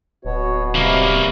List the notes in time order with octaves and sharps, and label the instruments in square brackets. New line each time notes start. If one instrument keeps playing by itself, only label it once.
[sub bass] D1 [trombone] B2 [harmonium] F#4 C#5
[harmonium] C3 G3 F5 [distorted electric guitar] F#3 A#3